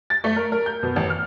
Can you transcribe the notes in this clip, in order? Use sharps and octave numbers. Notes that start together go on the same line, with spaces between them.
A6
A3
A#4
A#4
G6
B2
A1
F6